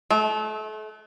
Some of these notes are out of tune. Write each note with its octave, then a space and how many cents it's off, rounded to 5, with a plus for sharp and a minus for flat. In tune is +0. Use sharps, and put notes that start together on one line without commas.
A3 -35